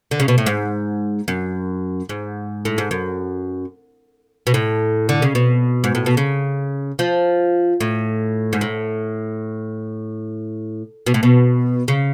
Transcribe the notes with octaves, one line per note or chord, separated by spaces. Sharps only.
D3
C#3
B2
A2
G#2
F#2
G#2
A2
G#2
F#2
B2
A2
D3
C#3
B2
G#2
A2
B2
C#3
F3
A2
G#2
A2
B2
A2
B2
C#3